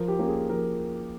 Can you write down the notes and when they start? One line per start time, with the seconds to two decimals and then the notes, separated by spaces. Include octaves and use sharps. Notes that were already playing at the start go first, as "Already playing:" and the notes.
Already playing: F3 A#4
0.08 G4
0.19 A#3 C#4
0.28 G#4
0.49 F3 A#4